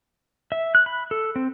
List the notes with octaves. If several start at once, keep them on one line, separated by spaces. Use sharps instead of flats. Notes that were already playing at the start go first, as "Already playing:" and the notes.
E5
F#6
B5
A4
C4